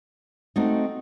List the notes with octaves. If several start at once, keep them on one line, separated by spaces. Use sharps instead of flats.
A3 C4 D#4 F#4